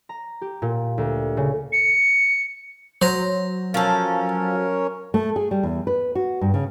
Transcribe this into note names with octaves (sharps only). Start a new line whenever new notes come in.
A#5
G4
A#2
D2
C#3
C#7
F#3 C5 A#5
F3 C#4 A4 A#4 C#5
A3
G#4
G3
E2
B4
F#4
G2
C#3